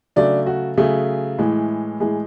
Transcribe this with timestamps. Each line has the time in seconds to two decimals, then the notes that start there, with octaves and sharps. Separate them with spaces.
0.16 C#3 F#3 A3 D4 D5
0.46 F#4
0.77 C#3 F#3 A3 G#4
1.39 A2 E3 G#3
2.00 A2 E3 G#3 G#4